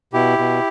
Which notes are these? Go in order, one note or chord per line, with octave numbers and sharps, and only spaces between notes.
B2 E4 G4
B2